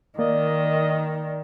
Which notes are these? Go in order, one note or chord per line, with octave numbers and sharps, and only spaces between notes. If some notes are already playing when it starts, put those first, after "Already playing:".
D#3 A#3 D5 D#5